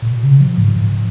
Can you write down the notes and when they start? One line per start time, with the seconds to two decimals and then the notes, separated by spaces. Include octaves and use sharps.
0.02 A#2
0.12 B2
0.23 C#3
0.40 F3
0.58 G#2
0.76 G#2